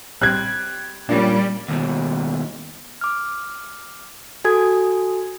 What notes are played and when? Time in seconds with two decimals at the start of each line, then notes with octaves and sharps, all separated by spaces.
0.21 G3 C4 F#6 G#6
1.09 A#2 G3 C#4 D4
1.68 D#2 B2
3.01 D6 F6
4.44 F#4 A4 G#5 D#6 G#6